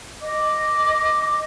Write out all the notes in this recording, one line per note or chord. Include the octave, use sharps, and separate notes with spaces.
D#5 D6